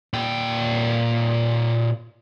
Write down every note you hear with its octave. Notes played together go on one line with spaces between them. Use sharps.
A#2 G5